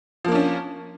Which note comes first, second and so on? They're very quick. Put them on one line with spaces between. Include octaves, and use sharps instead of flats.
F3 A#3 D4 C#4